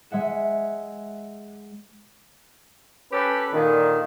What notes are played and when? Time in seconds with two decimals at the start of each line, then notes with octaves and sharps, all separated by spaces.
0.11 G#3 E5 F#5 E7
3.12 C#4 G4 A4 B4
3.53 A#2 D3 D#3